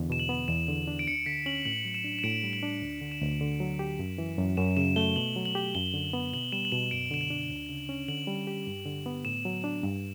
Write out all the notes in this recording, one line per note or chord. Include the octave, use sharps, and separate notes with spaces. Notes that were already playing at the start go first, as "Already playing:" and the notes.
Already playing: E2 D3
B2 E7
F#7
B3
E2 E7
D3
D4
D7
D2 C#7
D3 B6
C#4 F#7
A2 F#7
F#3
E7
D4
E7
A2 D7
G3
F#7
D4
D2
D3
E7
D2
D3
F#3
G4
F#2
E3
F#2
F#2 E7
C#3 E7
A3 G7
B2 F#7
F#3
F#7
G4
F#2 G7
D3
B3
B2 F#7
G3 E7
F#7
B2 E7
F#2 D7
D3 E7
F#7
D4
D2
C#3
C#4
D3 F#7
G3
G4
G2
D3
B3
A2 E7
F#3
D4
G2